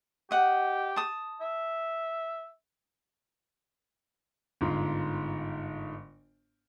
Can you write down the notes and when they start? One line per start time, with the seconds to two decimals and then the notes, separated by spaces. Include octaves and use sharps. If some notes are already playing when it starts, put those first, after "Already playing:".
0.31 G4 D#5 F#5
0.96 A5 D#6
1.41 E5
4.61 G1 G#2 F4